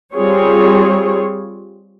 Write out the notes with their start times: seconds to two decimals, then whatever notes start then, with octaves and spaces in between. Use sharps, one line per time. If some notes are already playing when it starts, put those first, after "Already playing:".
0.15 G3 C4 F4 G#4 C#5